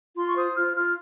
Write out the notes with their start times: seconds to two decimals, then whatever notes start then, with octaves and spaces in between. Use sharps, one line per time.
0.16 F4 C6
0.28 C#6
0.36 C5 D#6
0.56 F4 F6
0.76 F4 F6